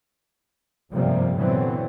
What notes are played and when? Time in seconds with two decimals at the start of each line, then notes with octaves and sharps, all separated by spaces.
0.92 G1 G#2 C3 F3 G3 A#3
1.37 A#2 D3 E3 F#3 B3 C4